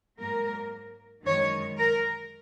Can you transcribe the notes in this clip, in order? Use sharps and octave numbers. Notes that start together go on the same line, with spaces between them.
G#2 F#3 A#3 A#4
F#2 D#3 G#3 C#5
A#4